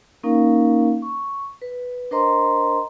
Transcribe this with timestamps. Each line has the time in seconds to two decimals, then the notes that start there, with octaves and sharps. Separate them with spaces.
0.23 A#3 C#4 D#4 A#4 F5
1.02 C#6
1.62 B4
2.11 D4 A#4 C5 D#5 A#5 C6